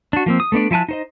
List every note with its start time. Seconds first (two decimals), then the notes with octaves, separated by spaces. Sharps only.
0.13 D4 F#4
0.26 F3 A#3 C4
0.40 D#6
0.52 A3 B3 D4 D5
0.71 F3 E4 G#5 A5 F#6
0.89 D#4 C5 D#5